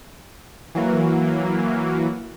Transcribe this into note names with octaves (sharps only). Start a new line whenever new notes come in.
E3 F#3 A#3